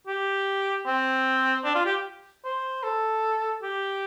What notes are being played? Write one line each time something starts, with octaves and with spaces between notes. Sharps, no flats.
G4
C4
D4
F4
G4
C5
A4
G4